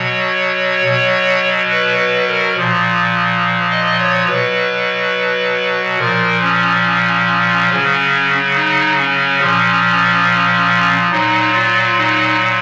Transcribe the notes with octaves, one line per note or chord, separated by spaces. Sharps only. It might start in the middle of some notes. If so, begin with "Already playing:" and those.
Already playing: B2 F#3 C#5
B2 F#3
B4
B4
A#4
A#2 F3
D#5
C#5
B2 F#3 B4
A#2 F3 A#4
C#4
C#3 F#3
D#4
C#4
A#2 F3
A#2 F#3 D#4
F4
D#4